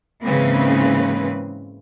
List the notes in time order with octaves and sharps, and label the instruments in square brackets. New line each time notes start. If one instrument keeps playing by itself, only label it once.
[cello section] G#2 C#3 E3 A#3 C4 B4